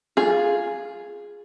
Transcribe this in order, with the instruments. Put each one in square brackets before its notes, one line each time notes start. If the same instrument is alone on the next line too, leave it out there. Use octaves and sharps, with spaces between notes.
[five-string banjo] F4 G#4